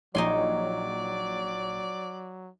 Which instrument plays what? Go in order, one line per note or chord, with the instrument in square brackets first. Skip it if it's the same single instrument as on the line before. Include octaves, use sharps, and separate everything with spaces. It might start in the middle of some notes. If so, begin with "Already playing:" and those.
[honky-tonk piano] A#1 C#5 [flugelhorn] F#3 [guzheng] D#4 G#5 C6 [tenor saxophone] D5